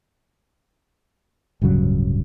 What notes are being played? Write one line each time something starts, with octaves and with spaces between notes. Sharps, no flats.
D1 G2 C#3 F#3